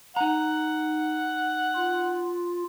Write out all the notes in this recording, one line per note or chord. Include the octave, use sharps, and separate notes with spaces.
D#4 F#5 A#5
F4